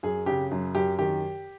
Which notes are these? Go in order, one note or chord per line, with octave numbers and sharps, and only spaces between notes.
F#2 G#4
C#3 G4
F#2
F#2 G4
D#3 G4